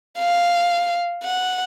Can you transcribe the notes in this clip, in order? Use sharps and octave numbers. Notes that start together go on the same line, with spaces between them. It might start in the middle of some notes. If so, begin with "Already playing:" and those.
F5
F#5